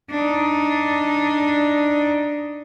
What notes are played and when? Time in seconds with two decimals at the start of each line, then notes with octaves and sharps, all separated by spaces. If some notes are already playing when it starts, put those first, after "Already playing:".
0.10 D4 D#4